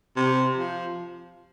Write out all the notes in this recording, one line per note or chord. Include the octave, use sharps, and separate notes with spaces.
C3
F3